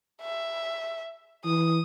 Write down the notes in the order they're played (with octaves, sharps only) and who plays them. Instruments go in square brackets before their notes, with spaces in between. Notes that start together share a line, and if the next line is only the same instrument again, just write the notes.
[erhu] E5
[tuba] E3 [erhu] D#6